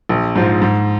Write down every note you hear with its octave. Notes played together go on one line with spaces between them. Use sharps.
A#1
G#2 F3
G#2